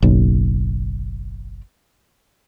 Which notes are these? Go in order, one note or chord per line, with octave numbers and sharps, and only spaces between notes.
F#1 B1